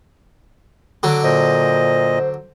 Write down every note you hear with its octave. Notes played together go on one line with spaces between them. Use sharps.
D3 F#3 D6
A#2 C5 D#5